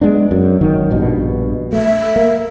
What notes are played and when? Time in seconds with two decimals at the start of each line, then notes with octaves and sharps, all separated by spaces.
0.01 G#3 B3 D4
0.31 F#2
0.61 G#1 D#3 F#3
0.91 A#1 G2 B2
1.73 A3 E5
2.16 A#3